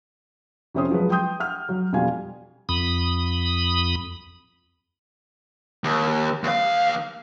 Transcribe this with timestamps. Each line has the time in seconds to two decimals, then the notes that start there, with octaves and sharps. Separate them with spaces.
0.74 F2 C3 C#4 C5 D#6
0.91 F3 F#3 G#3 B4
1.10 G5 C6 D#6 G6
1.40 F#5 F6
1.69 F#3
1.93 F2 B2 G3 F4 F5 G#5
2.69 F2 B5 D#6
5.84 D#2
6.43 D#2 F5